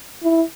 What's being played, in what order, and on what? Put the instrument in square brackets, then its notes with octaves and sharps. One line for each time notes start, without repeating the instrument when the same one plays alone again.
[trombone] E4